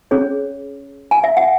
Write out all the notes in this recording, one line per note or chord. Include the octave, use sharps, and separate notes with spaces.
C#4 G#4 C#5
G#5
E5
F#5